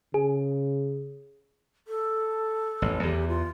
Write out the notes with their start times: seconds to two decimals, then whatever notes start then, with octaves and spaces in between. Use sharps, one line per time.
0.14 C#3 G#4
1.88 A4
2.82 A1 F2
3.03 E2 D#3 E3 G4
3.29 F4